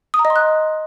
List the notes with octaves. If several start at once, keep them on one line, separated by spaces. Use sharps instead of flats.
D#6
A#5
D#5
C6
F#6